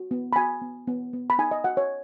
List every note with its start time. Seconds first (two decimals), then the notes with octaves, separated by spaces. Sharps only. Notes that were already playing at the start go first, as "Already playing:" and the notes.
Already playing: F#4
0.11 B3
0.33 B5
0.36 F#4 G#5
0.62 B3
0.87 B3
1.13 B3
1.30 B5
1.39 D#4 G#5
1.51 D#5
1.64 F#4 F#5
1.77 C#5